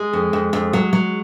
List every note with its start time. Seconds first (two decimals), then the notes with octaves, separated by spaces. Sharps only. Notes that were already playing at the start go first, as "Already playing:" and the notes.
Already playing: G#3
0.13 F2
0.33 F2
0.53 F2
0.73 F#3
0.93 F#3